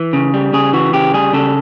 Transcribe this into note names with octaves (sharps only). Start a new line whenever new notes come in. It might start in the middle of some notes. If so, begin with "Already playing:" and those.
Already playing: E3
C#3
G3
C#3 G#4
E3 F#4
C#3 G4
G3 G#4
C#3 A4